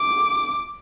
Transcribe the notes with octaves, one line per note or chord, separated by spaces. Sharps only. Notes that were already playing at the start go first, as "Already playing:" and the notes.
Already playing: D6